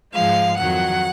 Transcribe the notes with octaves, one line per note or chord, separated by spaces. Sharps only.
G#2 F3 G#3 F5
F2 D#3 F#3 F#5